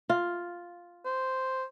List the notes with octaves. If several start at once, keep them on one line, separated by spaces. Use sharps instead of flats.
F4
C5